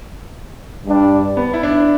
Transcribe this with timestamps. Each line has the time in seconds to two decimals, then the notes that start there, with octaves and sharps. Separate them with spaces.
0.86 G2 G3 D4
1.37 B3
1.53 E4
1.63 D4